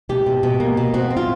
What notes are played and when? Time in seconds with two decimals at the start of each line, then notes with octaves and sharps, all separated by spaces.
0.09 B2 G4
0.26 B2
0.43 B2
0.60 A#3
0.77 B2
0.94 C4 F#4
1.10 C4
1.17 F4